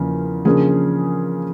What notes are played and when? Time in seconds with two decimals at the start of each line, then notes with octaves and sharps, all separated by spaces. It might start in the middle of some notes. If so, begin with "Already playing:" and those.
Already playing: E2 C#3 F3 A#3
0.45 C#3 F3 A#3 D4 G#4